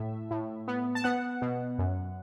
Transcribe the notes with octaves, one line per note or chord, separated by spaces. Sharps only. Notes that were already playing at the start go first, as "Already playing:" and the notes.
Already playing: A2 A3 E5
A2
B3
A5
B3 F#5
B2
F#2